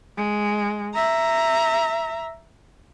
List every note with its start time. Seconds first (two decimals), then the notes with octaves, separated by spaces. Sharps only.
0.17 G#3
0.94 E5 A#5